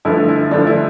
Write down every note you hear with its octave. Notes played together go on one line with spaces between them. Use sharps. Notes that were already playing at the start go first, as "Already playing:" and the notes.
G2 D3 F3 A3 E4
E4
G2 D3 F3 A3 D4
E4